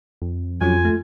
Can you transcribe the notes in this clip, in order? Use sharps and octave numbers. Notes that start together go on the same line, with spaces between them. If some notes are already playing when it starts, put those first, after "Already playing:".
F2
F2 F3 F#3 C#4 F4 G#5
A3